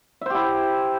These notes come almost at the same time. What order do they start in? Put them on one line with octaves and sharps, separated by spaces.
E5 C5 G4 E4